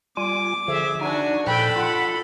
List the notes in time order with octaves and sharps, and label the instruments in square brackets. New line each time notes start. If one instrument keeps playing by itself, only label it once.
[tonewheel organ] G3 F4 G#5 [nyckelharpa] D6
[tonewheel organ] D3 F3 [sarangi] G#4 [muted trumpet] E5
[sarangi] D4 [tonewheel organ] D#4 [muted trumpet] F#4 [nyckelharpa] G#5
[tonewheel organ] A#2 F3 F#6 [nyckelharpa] A4 [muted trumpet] G5 [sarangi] B5
[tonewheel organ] F4 [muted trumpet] F#5